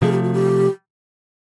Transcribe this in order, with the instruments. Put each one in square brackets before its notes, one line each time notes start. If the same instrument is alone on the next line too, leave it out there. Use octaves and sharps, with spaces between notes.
[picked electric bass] C3 F3 A3 [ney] G#4
[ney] G4
F#4
G4